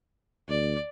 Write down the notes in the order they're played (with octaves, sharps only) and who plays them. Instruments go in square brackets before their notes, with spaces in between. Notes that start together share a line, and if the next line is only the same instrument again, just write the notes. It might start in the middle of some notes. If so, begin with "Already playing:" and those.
[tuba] D2 [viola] D5